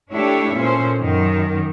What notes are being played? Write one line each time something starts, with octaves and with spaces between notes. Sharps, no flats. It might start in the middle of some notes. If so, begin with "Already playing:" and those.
A3 D4 E4 G4 C#5
A#2 C#4 A4 C5
F#2 D#3